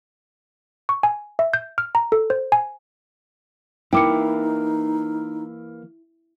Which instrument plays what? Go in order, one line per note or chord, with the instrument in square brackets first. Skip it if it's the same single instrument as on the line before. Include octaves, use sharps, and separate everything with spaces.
[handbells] C#6
G#5
E5
G6
F6
A#5
A4
C5
G#5
[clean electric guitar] E3 A#3 [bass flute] D#4 [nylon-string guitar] E4 [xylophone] G5 D6 C#7